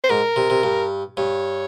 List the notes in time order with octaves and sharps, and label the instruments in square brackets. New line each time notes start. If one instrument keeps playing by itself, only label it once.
[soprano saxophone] C5
[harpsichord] G#2 [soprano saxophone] A#4
[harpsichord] C3
C3
G2
[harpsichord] G2 [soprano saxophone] C#5